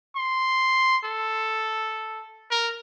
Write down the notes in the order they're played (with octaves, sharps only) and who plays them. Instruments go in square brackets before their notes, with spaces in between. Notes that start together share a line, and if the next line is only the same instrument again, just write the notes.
[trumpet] C6
A4
A#4